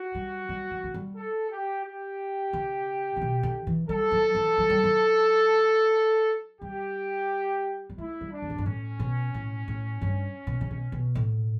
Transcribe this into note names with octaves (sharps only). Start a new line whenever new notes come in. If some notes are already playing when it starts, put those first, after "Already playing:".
Already playing: F#4
G3
G3
F#3
A3
G3
A4
G4
G4
C#3
C#3
B2
D3
E3
G3 A4
F#3
E3
F#3
G3
F#3
G3 G4
G3
A3 E4
G3
D4
E2
F#2
G2
A2 C#4
B2
A2
A2
G2
B2
C#3
B2
B2
A2